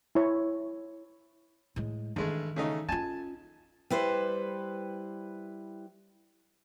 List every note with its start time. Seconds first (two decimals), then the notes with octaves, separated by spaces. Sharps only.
0.15 E4 C#5
1.76 A2 G#3
2.16 G2 D#3 E3 G#3 A3
2.56 C#3 A3 D#4
2.89 C#4 F4 G#5 A5
3.90 G3 E4 B4 C5